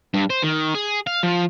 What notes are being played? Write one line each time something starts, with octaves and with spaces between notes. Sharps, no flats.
G2
C5
D#3
G#4
F5
F3